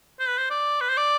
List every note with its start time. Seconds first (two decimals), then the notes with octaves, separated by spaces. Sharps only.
0.20 C5
0.28 B4
0.38 C5
0.50 D5
0.81 B4
0.89 C5
0.97 D5